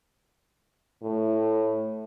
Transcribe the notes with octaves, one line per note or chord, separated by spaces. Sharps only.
A2